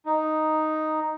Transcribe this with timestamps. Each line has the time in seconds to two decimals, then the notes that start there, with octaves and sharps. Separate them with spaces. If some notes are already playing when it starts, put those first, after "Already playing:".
0.06 D#4